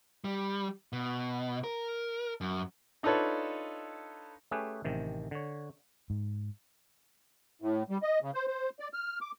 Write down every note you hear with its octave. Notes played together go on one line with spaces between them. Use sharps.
G3
B2
A#4
F#2
D4 D#4 F4 A4 B4 C#5
A3 C#4 G4 G#4 B4
A1 C3 D#3
D3 C#5
G#2
A2
G3
D#5
C#3
C5
C5
D5
F6
D6